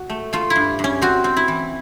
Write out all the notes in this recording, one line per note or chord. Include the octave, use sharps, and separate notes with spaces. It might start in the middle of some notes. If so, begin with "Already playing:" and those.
Already playing: F#4
A3
A3 F4
E4
G2
G2
C#4
C4 F#4
C4
E4
E3